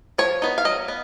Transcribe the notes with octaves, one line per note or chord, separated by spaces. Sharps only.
F3 C#5
B3 D#4
F5
F#3 D#5
B3